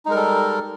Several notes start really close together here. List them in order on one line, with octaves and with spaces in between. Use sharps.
D#4 G#3 A#4 G3 A4